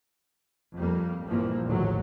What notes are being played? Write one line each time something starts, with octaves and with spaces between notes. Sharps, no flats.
F2 G3 A#3
A#1 G2 E3 F3 A#3
A#1 D#2 A2 D3 F#3